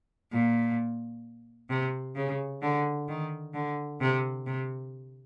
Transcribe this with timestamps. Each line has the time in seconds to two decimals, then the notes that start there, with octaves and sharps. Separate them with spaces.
0.32 A#2
1.70 C3
2.16 C#3
2.62 D3
3.08 D#3
3.54 D3
4.01 C3
4.47 C3